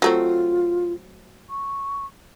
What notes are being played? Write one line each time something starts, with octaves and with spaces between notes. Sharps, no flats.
F#3 A3 C4 F4
C#6